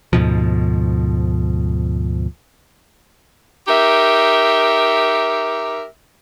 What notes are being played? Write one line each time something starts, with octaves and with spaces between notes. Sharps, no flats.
D2 G#2 B2 F3
D#4 G4 A#4 E5